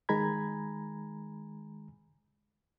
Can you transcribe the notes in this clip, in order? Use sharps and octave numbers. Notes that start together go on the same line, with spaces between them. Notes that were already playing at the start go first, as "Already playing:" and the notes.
D#3 G#3 G#5 A#5 B5 G#6